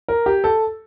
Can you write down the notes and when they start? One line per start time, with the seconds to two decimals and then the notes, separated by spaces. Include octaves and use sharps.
0.08 A#4
0.26 G4
0.44 A4